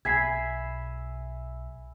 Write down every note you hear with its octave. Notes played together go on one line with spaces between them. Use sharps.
B1 E5 G#5 B5 G#6 B6 C7